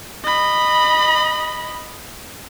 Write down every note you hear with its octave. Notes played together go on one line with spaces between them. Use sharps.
D#5 B5